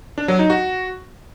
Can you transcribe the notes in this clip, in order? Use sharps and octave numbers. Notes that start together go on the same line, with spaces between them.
D4
F#3
D#4
F#4